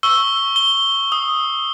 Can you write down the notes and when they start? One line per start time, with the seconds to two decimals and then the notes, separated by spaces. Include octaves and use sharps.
0.03 C#6 E6 G7
0.56 G7
1.12 D#6